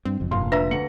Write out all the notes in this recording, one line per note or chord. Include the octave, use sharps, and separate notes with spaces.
G2 C4
F#1 F2
F1 G2 A#2 F5 C6
D4 B4 E5 F5 A#5 A#6
D2 C#7 F#7